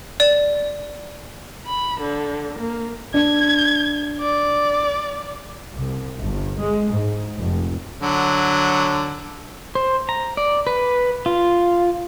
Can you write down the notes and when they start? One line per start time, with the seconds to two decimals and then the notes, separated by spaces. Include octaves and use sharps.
0.20 D5
1.66 B5
2.01 D3
2.59 A#3
3.14 D4 G#6
4.20 D5
5.76 C2
6.22 G1
6.61 G#3
6.93 G#2
7.38 F1
8.01 D3 F#3
9.75 C5
10.09 A#5
10.37 D5
10.67 B4
11.26 F4